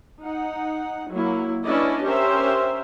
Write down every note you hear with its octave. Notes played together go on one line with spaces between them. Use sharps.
D#4 F#5
F#3 A#3 E4
C#4 D4 E4 B4 D5 D#5
C#4 G4 A#4 C5 E5